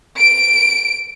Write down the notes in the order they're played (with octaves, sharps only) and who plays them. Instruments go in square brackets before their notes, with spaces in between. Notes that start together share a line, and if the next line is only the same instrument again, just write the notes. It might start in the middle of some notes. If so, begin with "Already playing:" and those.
[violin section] D7